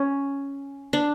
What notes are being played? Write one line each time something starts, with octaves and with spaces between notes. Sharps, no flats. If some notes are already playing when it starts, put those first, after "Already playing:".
Already playing: C#4
D4